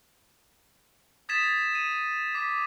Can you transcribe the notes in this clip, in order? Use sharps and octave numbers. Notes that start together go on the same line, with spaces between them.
D#6 G#6 A6 B6 E7
D#7
D6 B6